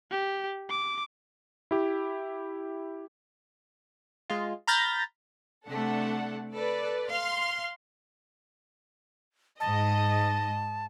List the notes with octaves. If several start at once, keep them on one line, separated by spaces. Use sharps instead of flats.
G4
D6
E4 G4
G#3 F4
A#5 B5 F6 G6 A6 A#6
C3 A3 D4 A4 F#5
A4 B4 D5
F5 C6 F6 C7
G#2 D#5 A5